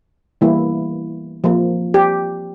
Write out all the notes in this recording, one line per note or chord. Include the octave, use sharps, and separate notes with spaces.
E3 G3 A#3 E4
F3 A#3
G4